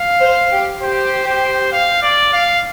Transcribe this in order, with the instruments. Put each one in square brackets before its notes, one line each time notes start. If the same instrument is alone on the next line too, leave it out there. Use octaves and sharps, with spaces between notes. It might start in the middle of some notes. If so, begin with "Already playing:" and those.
Already playing: [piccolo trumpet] F5
[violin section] C5
G4
[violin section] G4 [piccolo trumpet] C5
[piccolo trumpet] C5
F5
D5
F5